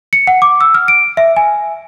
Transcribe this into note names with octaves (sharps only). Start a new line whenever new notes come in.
C#7
F#5
D6
E6
F6
D7
E5
G#5